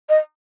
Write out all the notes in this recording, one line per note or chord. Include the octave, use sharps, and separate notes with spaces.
D#5